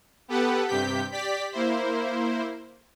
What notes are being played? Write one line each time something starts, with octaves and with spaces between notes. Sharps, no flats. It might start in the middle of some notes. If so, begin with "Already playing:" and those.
B3 G4 A4 B4 F#5
G2 C3 G4 G6 B6
G4 D5 B6
A#3 E4 C5